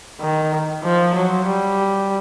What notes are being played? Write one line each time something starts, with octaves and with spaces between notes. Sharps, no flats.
D#3
F3
F#3
G3